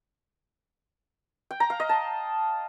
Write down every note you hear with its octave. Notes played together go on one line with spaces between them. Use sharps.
G5
A#5
F5
D#5
A5